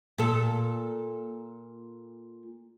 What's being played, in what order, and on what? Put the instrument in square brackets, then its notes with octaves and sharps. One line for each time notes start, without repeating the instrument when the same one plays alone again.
[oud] A#2 A4